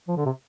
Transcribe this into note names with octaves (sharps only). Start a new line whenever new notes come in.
F3
D3
C3